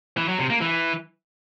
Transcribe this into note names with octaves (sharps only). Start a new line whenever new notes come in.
E3
F#3
C3
A#3
E3